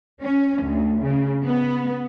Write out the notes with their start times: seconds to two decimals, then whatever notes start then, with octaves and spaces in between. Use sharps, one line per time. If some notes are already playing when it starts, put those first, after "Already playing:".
0.22 C#4
0.63 D2
1.02 C#3
1.45 B3